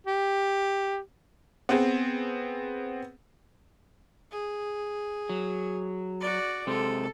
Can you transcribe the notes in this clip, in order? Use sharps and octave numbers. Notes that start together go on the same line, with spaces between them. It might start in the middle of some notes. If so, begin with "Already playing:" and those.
G4
B3 C4 G#4
G#4
F#3
F#4 D5
C3 G#3 C4 A4